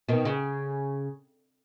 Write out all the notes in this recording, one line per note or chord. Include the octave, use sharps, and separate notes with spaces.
B2 D#3
C#3